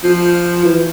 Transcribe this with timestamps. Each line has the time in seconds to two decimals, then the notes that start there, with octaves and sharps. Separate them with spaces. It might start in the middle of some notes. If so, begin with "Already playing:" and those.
0.03 F3
0.64 E3